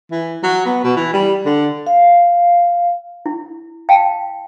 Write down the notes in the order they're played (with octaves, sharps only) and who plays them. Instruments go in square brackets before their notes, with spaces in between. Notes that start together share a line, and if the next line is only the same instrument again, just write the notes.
[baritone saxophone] E3
F#3
B3
B2
E3
G3
D3
[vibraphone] F5
[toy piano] E4
F5 G5 A5